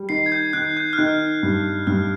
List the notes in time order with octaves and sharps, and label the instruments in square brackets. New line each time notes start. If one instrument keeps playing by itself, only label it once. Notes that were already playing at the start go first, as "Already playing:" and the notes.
Already playing: [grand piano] G3
[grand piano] D#3 [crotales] C7
[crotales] G#6
G6
[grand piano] D#3 [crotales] F#6
[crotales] G6
F6
[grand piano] D#3 [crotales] F#6
[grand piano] G2
[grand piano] G2 [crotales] F6